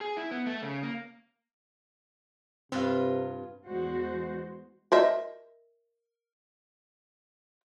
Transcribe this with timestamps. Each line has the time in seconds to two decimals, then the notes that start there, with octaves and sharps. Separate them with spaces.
0.01 G#4
0.17 E4
0.31 B3
0.46 A3
0.62 C#3
0.83 A#3
2.72 G2 C3 C4 F4 B4 F5
3.67 E2 G#3 F#4 C5
4.92 A#4 D#5 E5